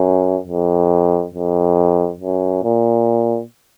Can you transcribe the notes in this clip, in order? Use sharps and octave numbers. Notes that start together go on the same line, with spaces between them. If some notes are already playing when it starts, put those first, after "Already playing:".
Already playing: F#2
F2
F2
F#2
A#2